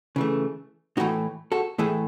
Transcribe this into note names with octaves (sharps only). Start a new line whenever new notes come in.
C#3 E3 A3
A2 E3 A3 D#4 F#4
F#4 A4
A2 E3 A3 E4 G#4